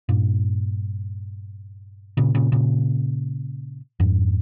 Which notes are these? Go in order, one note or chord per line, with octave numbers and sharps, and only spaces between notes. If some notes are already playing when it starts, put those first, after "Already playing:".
G2 A#2
A#2 C#3
A#2 C#3
A#2 C#3
F2 G#2